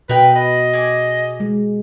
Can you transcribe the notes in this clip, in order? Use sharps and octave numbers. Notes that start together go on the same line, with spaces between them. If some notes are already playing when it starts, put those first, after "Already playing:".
B2 A#4 B4 D#5 G5
B4 D#5
G#4 D6
G#3